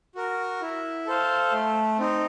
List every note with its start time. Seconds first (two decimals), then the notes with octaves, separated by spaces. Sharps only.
0.15 F#4 A#4
0.61 E4
1.06 A4 C5 F5
1.52 A3
1.99 C4 D#4